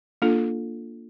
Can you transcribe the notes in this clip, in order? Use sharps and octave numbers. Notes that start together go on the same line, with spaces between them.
A#3 D4 F4 A4